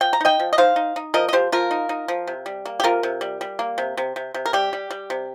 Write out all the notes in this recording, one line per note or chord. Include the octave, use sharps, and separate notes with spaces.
F3 G5
A#5
D#4 D#5 G5
F3
D#5
D#4 C5 F5
D#4
D#4
F3 A#4 D#5
D#5
F3 G4 C5
F3 F4 A#4
D#4
D#4
F3
C3
G3
A#3
G4
C3 F4 A#4
C3
G3
G3
A#3
C3
C3
C3
C3
A#4
G3 G4
G3
G3
C3